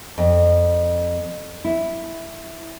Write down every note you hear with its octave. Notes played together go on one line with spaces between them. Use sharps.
F2
E4